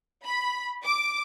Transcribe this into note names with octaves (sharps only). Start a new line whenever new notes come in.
B5
D6